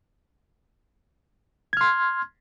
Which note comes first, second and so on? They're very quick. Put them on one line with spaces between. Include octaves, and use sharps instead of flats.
G#6 F6 C6